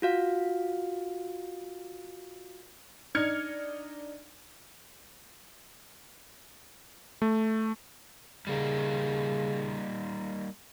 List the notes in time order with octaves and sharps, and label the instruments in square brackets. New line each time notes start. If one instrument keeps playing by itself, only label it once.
[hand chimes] F4 F#4 F5
[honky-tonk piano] D4 D#4 F6 G#6 C#7
[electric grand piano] A3
[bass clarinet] C#3 [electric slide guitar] G3 A#3 D#4